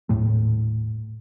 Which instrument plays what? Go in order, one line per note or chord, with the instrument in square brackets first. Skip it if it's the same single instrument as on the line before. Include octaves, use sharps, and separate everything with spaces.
[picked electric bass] D#1 A2 A3